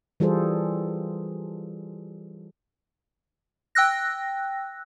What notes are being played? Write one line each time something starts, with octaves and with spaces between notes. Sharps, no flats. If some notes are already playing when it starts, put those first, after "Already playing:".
E3 G3 F4 G#4 A4 C5
G5 E6 F#6 A#6